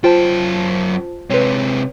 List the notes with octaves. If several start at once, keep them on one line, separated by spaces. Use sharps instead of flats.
F#2 F4 C5 G5 A5
C3 G#3 B4 C#5